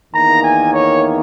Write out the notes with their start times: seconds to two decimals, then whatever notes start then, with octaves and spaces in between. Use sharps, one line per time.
0.13 E2 D#3 A#3 A#5
0.42 G#5
0.72 C#5